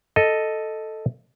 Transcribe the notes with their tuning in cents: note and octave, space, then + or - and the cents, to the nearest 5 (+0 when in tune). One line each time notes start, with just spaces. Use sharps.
A4 +0 D#5 +0